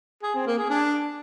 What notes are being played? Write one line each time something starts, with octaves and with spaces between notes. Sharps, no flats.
G#4
C4
A#3
G#4
D4